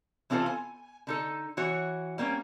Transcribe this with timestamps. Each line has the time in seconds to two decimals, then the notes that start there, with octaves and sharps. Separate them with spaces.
0.30 E3 C4 D4 F4 A4 C5
0.46 G#5
1.07 D3 D#4 A4
1.57 E3 F#4 C#5
2.18 G3 A#3 C4 C#4